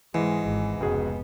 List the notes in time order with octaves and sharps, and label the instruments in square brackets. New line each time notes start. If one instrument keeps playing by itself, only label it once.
[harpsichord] G#2 [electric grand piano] E3 [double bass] G#3
[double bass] G#1
[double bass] F1 B3 [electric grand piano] C#2 F#4 G#4